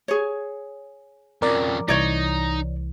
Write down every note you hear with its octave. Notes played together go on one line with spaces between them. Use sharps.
G#4 C#5
F2 C#3 A#4 D5
C2 E3 D#4 C#5 D5